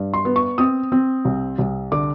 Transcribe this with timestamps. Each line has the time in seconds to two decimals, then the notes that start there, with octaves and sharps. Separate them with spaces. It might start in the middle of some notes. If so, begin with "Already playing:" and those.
Already playing: G2
0.14 C6
0.25 B3
0.36 C#6
0.58 C4 D#6
0.92 C4
1.25 C2
1.59 C2
1.92 D3 D6